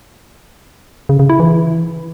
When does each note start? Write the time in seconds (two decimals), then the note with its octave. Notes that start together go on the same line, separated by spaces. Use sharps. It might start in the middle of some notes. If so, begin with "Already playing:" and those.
1.09 C#3
1.19 C#3
1.29 E4
1.40 E3